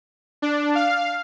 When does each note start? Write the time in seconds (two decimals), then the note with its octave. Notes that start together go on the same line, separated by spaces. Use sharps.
0.42 D4
0.75 F5